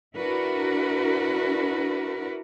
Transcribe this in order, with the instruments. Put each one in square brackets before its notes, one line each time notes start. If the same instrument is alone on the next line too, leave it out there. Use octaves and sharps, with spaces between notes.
[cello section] D4 E4 F#4 A#4 B4